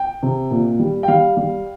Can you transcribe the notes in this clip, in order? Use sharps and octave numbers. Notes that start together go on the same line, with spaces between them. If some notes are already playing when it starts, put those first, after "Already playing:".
Already playing: G5
C3
A#2
G3
G5
G3 F5
G3